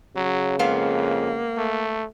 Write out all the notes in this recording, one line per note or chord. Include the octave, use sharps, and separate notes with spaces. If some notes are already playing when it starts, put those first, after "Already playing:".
C#3 F#3
F2 G#3 A#3 B3 F5
A3